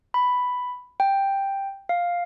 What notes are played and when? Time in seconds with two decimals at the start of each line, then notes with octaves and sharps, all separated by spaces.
0.14 B5
1.00 G5
1.89 F5